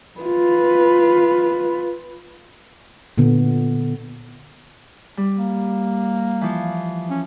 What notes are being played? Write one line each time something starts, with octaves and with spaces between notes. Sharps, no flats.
F4 B4
A#2 D3 B3
G3
A#3
E3 F3
C#4